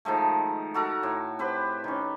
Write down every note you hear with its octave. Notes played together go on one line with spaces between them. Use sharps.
D#3 F3 G#3 A3
F#4 A4 A#4
A2
C4 G4 B4
D#3 C#4